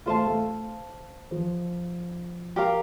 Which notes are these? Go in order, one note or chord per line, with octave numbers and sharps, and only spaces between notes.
A3 F4 C5 F5 A5
A3
F3
G4 A#4 F5 A#5